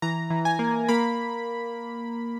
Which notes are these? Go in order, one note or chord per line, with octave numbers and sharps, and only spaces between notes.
E3 A#5
E3
G#5
A#3
A#3 B5